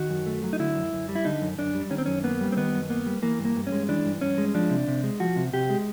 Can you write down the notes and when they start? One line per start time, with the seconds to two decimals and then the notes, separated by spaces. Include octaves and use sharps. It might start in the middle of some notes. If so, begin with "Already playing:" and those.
Already playing: D#3 F#4
0.10 F#2
0.26 A3
0.44 F#3
0.53 D#4
0.59 D3 E4
0.77 F#2
0.93 F#2
1.09 G3
1.15 E4
1.25 D3 D#4
1.42 F#2
1.58 F#2 D4
1.75 G3
1.91 D#3 C#4
1.98 C4
2.06 F#2 C#4
2.24 A#3 B3
2.41 G3
2.52 C4
2.57 D#3 B3
2.73 F#2
2.90 A#3 B3
3.06 G3
3.22 E3 A#3
3.39 G2
3.45 A#3
3.56 G2
3.67 C#4
3.72 G#3
3.89 E3 D4
4.05 G2
4.21 G2 C#4
4.38 G#3
4.54 F3 D4
4.70 C3
4.88 C3
5.03 G#3
5.20 F3 F#4
5.36 C3
5.53 C3 G4
5.70 G#3